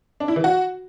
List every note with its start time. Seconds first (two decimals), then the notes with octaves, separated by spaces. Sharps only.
0.20 D4
0.28 E4
0.36 E3
0.44 F#4